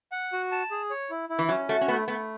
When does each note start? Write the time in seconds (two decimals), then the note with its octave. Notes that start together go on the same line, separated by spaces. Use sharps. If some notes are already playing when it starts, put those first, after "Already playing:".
0.12 F#5
0.33 F#4
0.52 A5
0.71 G#4
0.90 C#5
1.10 E4
1.29 E4
1.39 E3
1.49 F#3 C#4
1.68 A3 F#4
1.81 C#4
1.88 A3 B3
2.08 A3 B3